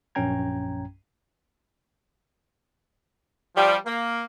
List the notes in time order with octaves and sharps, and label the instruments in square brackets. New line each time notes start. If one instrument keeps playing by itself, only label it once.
[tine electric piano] A#1 F#2 C#4 G5 A#5 G#6
[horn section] F3 G3
A#3